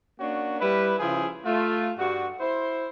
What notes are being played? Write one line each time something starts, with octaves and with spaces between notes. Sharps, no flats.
A#3 C#4 D4 F#4
G3 E4 B4
C#3 F3 E4 G#4
A3 F4
G2 F#4
E4 C5